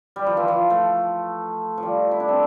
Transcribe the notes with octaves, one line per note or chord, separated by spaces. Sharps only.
G3
F3
E3
F3
A3
F3
G3
E4
D4
C4